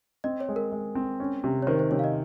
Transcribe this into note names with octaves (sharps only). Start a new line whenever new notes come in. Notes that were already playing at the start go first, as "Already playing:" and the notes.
C4 D#5
C#5
G#3
A#4
G#3
C4
C#4
C3
C#5
D#3 C5
C5
C3 C#5
F5
D#5